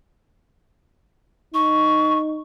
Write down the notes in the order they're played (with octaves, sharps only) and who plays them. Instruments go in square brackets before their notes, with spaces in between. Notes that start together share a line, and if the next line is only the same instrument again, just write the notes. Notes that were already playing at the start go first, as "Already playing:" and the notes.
[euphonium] D#4 [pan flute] C#6